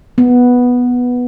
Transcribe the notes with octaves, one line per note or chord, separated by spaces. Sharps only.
B3